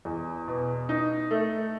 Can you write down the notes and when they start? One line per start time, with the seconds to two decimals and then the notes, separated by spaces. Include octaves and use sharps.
0.05 E2
0.48 B2
0.89 D#4
1.31 A3